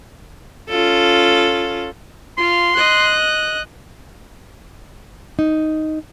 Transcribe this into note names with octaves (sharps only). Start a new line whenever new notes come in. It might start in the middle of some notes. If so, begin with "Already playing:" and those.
C#4 F4 A4
F4 F5 C6
D#5 F#6
D#4